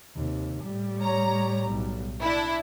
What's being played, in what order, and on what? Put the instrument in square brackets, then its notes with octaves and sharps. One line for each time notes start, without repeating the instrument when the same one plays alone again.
[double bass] D#2 C3
A2 G3
[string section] C#5 A#5
B1
D4 E4